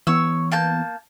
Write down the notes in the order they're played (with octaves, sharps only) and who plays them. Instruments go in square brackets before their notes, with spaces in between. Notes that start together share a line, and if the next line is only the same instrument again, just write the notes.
[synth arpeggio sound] E3 B3 [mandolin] C#5 E6
[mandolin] A#3 A5 G6